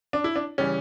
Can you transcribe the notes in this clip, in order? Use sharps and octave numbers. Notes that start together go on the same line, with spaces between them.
D4
E4
D4
C#3 E3 G3 C#4